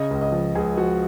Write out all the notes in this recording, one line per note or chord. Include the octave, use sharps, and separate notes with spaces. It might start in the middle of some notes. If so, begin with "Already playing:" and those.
Already playing: C#3 D#5
C#2
D#5
F3
C#2 G#4
F3 F#4